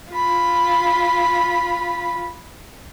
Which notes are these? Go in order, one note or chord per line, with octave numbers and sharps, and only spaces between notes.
F4 B5